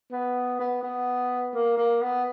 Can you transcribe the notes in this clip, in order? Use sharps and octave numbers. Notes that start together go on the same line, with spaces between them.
B3
B3
B3
A#3
A#3
B3